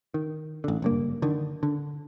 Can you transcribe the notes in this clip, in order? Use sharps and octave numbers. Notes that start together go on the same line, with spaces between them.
D#3
A1 D3
F#1 G2 A#3
D3 D#3
D3